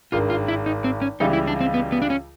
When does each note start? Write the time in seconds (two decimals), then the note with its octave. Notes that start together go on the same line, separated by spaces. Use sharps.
0.12 G#1 G2 D#3 G#3 F4
0.30 F4
0.48 E4
0.66 D#4
0.84 C4
1.02 C#4
1.20 C#2 C#3 E3 G3 D#4
1.33 E4
1.47 D4
1.61 C4
1.74 B3
1.92 B3
2.02 D4
2.10 C#4